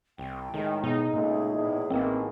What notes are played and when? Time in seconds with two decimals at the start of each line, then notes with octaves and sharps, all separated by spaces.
0.18 C2 G5
0.54 A2 D#3 G#3
0.84 B2 D#4 G#4
1.13 C#2 A#2 G#3 A3
1.54 E2 A2
1.90 A1 D#3 E3 A#3 C4